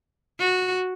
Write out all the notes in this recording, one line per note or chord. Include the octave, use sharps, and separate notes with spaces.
F#4